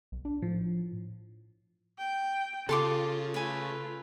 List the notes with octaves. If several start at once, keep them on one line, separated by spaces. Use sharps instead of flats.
B1
D4
A2 F3
G5
C#3 F4 A4 A5 C6 D6
A3 F4 B4 G#5